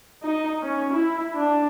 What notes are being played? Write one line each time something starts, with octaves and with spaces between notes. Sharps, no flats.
D#4
C#4
E4
D4